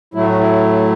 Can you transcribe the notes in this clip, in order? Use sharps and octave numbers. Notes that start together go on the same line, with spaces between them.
A2 F#3 A3 E4
F#4
E4